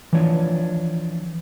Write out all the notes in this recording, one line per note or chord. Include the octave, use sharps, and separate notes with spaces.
E3 F3 D4 C#5